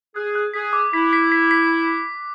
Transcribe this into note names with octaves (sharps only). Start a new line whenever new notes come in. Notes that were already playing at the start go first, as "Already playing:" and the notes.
G#4 F#6
F#6
G#4 B6
D6
E4 B6
B6
B6
B6